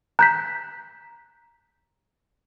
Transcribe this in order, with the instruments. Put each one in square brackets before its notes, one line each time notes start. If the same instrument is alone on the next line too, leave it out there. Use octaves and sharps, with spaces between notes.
[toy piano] A#5 [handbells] F#6 G6 B6